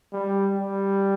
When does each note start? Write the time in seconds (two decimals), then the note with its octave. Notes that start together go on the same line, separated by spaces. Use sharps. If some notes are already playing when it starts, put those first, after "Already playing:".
0.13 G3
0.59 G3